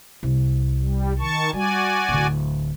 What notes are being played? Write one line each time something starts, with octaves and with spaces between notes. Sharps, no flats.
C2
G3
D#3 A5 C#6
G3 F#4 D5 G#5
D1 D3